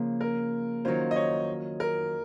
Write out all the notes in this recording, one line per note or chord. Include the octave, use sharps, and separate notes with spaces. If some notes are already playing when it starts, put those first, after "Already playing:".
Already playing: C#3 F3 A#3 C#4
A#4
D#3 F#3 C#4 F4 C5
D#5
C#5
A#4